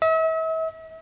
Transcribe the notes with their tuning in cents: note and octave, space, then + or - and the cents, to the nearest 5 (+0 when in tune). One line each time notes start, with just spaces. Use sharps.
E5 -40